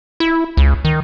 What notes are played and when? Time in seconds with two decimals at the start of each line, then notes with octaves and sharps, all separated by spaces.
0.20 E4
0.57 C#2
0.85 D#3